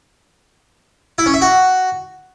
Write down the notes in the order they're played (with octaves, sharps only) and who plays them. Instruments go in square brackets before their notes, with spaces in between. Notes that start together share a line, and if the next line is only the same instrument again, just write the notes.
[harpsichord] E4
C#4
E5
F#4